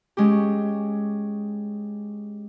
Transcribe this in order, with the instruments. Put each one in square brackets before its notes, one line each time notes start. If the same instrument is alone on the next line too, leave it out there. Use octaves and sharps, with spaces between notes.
[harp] G#3 C#4 G4